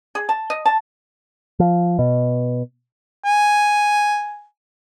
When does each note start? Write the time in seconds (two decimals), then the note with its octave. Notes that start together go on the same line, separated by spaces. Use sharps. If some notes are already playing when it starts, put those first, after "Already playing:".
0.15 G#4
0.29 A5
0.50 D#5
0.65 A5
1.60 F3
1.99 B2
3.24 G#5